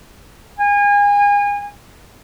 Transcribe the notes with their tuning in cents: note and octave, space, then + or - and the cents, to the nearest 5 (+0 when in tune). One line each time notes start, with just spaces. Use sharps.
G#5 -30